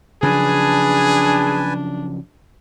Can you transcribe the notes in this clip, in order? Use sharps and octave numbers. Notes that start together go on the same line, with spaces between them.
C#3 F3 F#3 D4 G#4 B4 G#5 A5